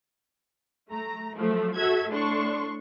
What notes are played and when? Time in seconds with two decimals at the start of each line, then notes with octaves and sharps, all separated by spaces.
0.91 A3 A#5
1.37 F3 F#3 A3
1.76 F#4 A4 E5 G#6
2.10 A2 D4 C6 C#6